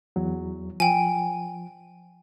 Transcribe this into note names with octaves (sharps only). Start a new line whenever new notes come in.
E2 F#3
F3 G5 G#5